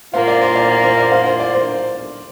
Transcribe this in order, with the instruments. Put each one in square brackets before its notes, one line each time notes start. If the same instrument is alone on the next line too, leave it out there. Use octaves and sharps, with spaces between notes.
[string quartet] A#2 A#3 F4 [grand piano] C5 F5
[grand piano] D5
C5
D5
D5
C5
D5
C5 F5
C5
D5
C5